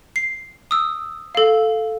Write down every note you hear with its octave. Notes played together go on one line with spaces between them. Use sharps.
C7
D#6 E6
A4 F5